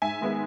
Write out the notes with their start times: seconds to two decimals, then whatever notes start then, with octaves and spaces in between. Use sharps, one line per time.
0.02 G#2 E5 G#5
0.21 D#3 G#3 B3